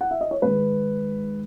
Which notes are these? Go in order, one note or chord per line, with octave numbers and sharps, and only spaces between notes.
F#5
E5
D#5
C#5
G#2 D#3 G#3 B4